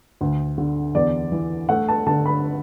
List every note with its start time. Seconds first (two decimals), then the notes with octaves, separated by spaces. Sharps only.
0.21 D2
0.58 D3
0.95 E2 D5
1.32 E3
1.69 A3 F#5
1.88 A5
2.06 D3 A5
2.26 B5